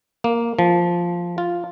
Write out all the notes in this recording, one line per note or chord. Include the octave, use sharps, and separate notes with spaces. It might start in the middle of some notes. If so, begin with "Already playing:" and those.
A#3
F3
F4